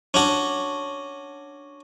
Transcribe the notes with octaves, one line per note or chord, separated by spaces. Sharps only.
C#4 D4 F#4